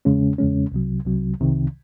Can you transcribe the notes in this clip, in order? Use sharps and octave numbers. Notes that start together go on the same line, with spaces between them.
E2 C#3 G#3 C#4
E2 C#3 G#3 C#4
C2 C3 F#3
C2 C3 F#3
C2 C3 D#3